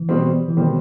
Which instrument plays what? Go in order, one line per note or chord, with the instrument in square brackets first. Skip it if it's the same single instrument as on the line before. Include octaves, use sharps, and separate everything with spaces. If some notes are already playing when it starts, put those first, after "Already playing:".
Already playing: [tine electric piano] E3
[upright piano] B2 G3 C4
[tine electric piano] E3
[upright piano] B2 G3 C4 [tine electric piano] D#3